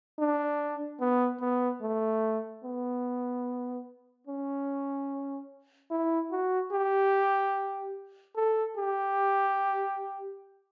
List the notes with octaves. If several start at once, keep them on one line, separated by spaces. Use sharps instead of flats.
D4
B3
B3
A3
B3
C#4
E4
F#4
G4
A4
G4